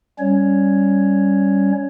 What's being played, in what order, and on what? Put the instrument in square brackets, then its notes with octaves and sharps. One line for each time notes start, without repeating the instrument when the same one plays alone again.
[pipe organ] G3 C#4 C#5